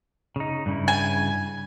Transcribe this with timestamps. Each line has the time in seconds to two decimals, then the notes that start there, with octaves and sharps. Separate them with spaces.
0.36 C#3 D#4
0.66 G2 C#3 E4
0.88 G#5